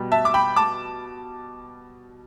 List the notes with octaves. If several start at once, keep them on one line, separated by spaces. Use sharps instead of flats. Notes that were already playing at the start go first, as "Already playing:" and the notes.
Already playing: B2 G3
E5 A5
D6
G5 B5
A5 D6